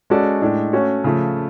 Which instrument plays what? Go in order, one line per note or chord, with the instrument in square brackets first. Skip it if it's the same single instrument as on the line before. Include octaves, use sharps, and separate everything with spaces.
[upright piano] G#3 C#4 F#4 A4 D5
A2 G#3 D4
A3 C#4 F#4 C#5
C#3 F3 A3